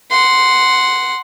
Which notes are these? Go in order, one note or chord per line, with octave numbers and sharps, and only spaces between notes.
F#5 C6